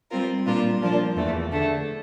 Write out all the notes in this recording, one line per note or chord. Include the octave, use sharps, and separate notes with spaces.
G3 C4 F4 A#4
A#2 G3 D4 F4 A#4
F3 A#3 D4 F4
E2 E3 A3
D3 A3 D4